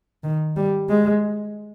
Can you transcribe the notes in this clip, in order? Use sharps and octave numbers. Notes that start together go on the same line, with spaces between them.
D#3
G3
G#3